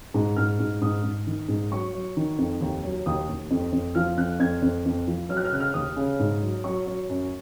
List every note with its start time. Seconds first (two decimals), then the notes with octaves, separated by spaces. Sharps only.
0.14 G#2
0.36 G#2 F6
0.59 G#2
0.81 G#2 D#6
1.03 G#2
1.27 D#3
1.48 G#2
1.71 F#3 C#6
1.93 F#3
2.17 D#3
2.38 F2
2.61 D#2
2.83 F#3
3.06 D#2 D#6
3.29 D#2
3.50 F2
3.72 F2
3.95 F3 F6
4.17 F2 F#6
4.39 F2 G#6
4.62 F2
4.85 F2
5.07 F3
5.29 F#3 F6
5.37 F#6
5.45 F6
5.52 C#3 F#6
5.60 F6
5.74 D#2 D#6
5.96 C#3
6.19 G#2
6.42 F#3
6.64 F#3 C#6
6.87 F#3
7.09 F#2